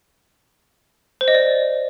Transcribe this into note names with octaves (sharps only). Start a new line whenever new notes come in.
C5
D#5
D5